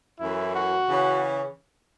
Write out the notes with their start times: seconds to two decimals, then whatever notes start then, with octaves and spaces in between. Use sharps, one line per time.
0.20 F#2 E3 A3 E4
0.54 F#4
0.88 C#3 E3 C#4